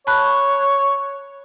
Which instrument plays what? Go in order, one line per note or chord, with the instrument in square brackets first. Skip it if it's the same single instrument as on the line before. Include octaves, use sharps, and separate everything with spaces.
[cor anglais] C#5 [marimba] A5 B5 F#6